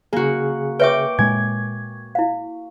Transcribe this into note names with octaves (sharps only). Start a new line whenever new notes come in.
C#3 A#3 F#4 G#4
B4 C#5 E5 G5 C#6 D6
A#2 G#3 A#3 G#5 G#6
E4 F5